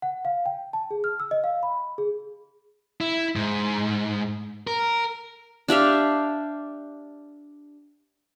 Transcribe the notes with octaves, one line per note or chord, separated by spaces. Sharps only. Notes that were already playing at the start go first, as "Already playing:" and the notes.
F#5
F5
G5
A5
G#4
F6
E6
D#5
F5
B5
G#4
E4
G#2
A#4
D4 G4 E5 F5